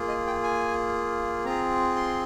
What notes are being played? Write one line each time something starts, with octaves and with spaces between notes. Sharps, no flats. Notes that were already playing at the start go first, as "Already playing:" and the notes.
Already playing: A#3 F4 G#4
D#5
G5
G#5
C4 F4 G#4 A#5
C6